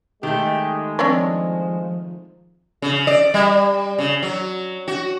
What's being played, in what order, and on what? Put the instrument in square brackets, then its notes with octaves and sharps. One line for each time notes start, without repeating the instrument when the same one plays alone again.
[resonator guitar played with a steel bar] D#3 A3 [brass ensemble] G#3 [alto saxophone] G4
[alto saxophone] F3 [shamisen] C4 D4 C#5
[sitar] C#3
D5
G3
C#3
F#3
F#4